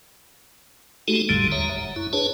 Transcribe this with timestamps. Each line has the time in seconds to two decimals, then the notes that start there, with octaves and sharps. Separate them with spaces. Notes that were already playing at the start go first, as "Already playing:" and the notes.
1.08 G#3 A3 D#4 F#4 G4 A4
1.29 A#1 F2 A2 D3 G3 G#3
1.52 D#2 C#5 E5 A#5
1.77 F#1
1.96 F#2 E4
2.13 D4 G#4 B4 C#5 A5